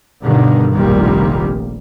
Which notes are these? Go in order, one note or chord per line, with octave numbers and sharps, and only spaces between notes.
G2 B2 D3 D#3
F1 A#1 A#2 D#3 G3 A#3